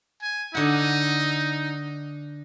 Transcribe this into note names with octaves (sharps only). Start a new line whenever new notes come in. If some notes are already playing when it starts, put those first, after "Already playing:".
G#5
D3 D#4 F#5